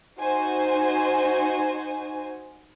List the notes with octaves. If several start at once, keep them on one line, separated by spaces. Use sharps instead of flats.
D#4 F#4 C5 G#5